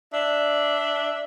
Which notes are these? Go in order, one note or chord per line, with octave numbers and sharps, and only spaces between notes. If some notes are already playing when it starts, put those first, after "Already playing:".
D4 E5